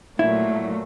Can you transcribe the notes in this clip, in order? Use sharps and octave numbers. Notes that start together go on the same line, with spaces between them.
A#2 F#3 A3 E4